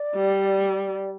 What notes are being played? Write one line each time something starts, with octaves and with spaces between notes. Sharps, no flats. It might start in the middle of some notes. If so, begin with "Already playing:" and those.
Already playing: D5
G3